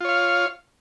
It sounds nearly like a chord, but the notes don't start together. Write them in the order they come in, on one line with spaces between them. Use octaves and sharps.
F4 C#5 F5